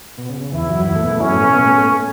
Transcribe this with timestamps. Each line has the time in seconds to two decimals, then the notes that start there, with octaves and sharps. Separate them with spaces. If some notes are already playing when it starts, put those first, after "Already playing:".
0.18 B2
0.29 C#3
0.40 C#3
0.53 E2 E3 E4
0.69 F#2 F#3
0.86 E2 E3
0.95 A2 A3
1.03 B2 B3
1.12 A2 A3
1.20 F#2 F#3 C#4
1.32 A2 A3
1.43 B2 B3
1.54 B2 B3
1.65 A2 A3
1.77 A2 A3